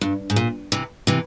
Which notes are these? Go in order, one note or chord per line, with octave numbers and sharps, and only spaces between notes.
G2
G#2
A#2
C3 E3
C3 E3